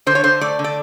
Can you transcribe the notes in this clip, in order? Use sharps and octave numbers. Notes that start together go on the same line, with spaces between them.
D3 C5
C#5
D3 C5
A3 D5
D3
D5